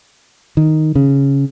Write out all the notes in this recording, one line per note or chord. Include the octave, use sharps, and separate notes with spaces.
D#3
C#3